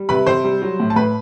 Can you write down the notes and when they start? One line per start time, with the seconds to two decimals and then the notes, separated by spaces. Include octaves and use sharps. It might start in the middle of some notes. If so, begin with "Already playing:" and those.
Already playing: G3
0.09 C3 B4 B5
0.26 C3 C5 C6
0.44 G3
0.62 F#3
0.80 A2
0.90 A5
0.96 A2 B4 B5